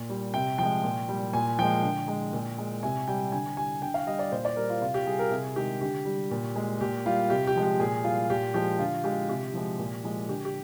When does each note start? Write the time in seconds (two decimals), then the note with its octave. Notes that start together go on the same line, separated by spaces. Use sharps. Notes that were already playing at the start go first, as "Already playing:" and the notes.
Already playing: A#2
0.09 G3
0.34 C3 G5
0.58 F3 G#3 G5
0.84 A#2
1.09 G3
1.33 A#2 G#5
1.59 F3 G#3 G5
1.83 D3
2.08 G#3
2.33 A#2
2.58 G#3
2.83 C3 G#5
3.08 G3 G5
3.32 D3 G#5
3.57 G3 G#5
3.82 D3 G5
3.94 F5
4.07 G3 D#5
4.19 D5
4.32 A#2 C5
4.45 D5
4.57 G3 A#4
4.70 F4
4.81 C3 F4
4.94 G4
5.07 G3 G#4
5.19 A#4
5.31 C3 G#4
5.56 D#3 G#3 G4
5.81 D3 G4
6.05 G3
6.31 A#2
6.56 G#3
6.81 A#2 G4
7.06 G3 F4
7.30 C3 G4
7.47 G4
7.56 F3 G#3
7.63 G4
7.80 A#2 G#4
8.04 G3 F4
8.30 A#2 G4
8.54 F3 G#3 G4
8.79 D3 F4
9.04 G#3 G4
9.29 C3 G4
9.54 F3 G#3
9.79 A#2
10.04 F3 G#3
10.29 D3 G4
10.45 G4